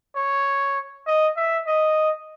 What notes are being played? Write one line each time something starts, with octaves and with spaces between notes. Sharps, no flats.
C#5
D#5
E5
D#5